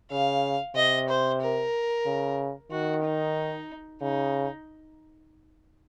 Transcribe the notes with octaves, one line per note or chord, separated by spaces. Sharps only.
C#3 F5
C3 D#5
C5
A#4
C#3
D#3 F#4
D#4
C#3 D#4